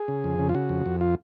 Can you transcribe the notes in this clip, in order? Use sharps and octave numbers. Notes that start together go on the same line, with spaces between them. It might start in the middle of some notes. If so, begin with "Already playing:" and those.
Already playing: G#4
C#3
F2
C#3
F4
C#3 F#4
F2
F2
F4